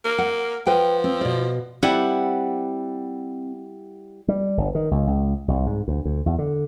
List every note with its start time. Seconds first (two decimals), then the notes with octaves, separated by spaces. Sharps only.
0.04 A#3
0.18 F#5
0.67 F3 B4 F#5 G5
1.04 C4
1.21 B2 D5
1.83 G3 C4 E4 F#5
4.28 G3
4.57 G1
4.75 D#3
4.91 C#2
5.07 C#2
5.48 C2
5.66 G#2
5.88 D2
6.05 D2
6.26 E2
6.39 D3